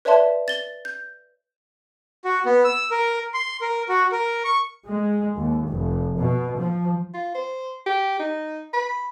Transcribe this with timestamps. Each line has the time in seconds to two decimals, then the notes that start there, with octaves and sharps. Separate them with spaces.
0.05 B4 C#5 D5 E5 A5 C6
0.48 A6 G7
0.85 G6
2.25 F#4
2.46 B3
2.64 E6
2.91 A#4
3.34 C6
3.61 A#4
3.89 F#4
4.12 A#4
4.44 C#6
4.87 G#3
5.35 D#2
5.68 F1
6.18 B2
6.58 F3
7.14 F4
7.34 C5
7.86 G4
8.19 D#4
8.73 B5